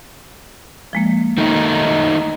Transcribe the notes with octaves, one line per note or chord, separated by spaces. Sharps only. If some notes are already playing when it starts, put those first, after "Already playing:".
F3 G#3 A#3
D#3 A3 D#4